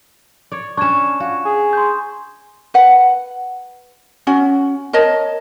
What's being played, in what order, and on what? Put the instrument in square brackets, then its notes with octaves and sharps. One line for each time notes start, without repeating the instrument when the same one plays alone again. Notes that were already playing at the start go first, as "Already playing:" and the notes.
[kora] C#5 D5
[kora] C#4 D4 [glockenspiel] C#6 G#6 E7
[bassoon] F4 [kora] F#4
[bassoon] G#4
[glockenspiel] C6 G6
[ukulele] B4 F#5
C#4 F#4
A#4 C#5 D#5 A5